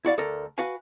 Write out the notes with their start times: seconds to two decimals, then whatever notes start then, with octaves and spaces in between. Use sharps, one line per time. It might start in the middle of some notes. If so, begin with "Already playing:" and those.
0.05 E4 F#4 D5 F5
0.18 D2 A4 A#4
0.58 F#4 B4 F5 G#5